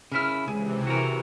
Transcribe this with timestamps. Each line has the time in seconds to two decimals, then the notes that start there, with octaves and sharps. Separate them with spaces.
0.12 C#3 E4 A#4 B4 F6
0.48 C#2 C3 E3 G#4
0.87 F#4 A#4